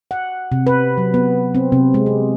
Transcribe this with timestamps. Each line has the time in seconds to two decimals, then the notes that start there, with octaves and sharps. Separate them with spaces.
0.11 F#5
0.52 C3
0.67 B4
0.98 F#3
1.14 B3
1.55 C4
1.72 C3
1.94 G#3
2.06 G4